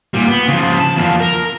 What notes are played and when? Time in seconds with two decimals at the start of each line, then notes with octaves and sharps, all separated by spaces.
0.14 A#2 G3
0.28 B3
0.48 C#3 F3
0.80 A5
0.96 E2 F3
1.20 A#4